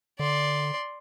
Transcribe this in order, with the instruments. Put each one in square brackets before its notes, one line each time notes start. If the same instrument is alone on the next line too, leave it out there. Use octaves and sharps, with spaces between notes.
[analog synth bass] D3 [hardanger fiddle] D5 C6